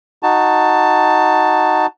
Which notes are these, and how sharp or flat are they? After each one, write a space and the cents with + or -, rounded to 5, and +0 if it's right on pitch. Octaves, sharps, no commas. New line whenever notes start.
D#4 +0 F#4 +0 A5 +10